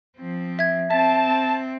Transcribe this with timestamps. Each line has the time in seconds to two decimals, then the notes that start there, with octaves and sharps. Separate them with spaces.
0.18 F3 C4
0.59 E5 G#6
0.91 C4 E5 A5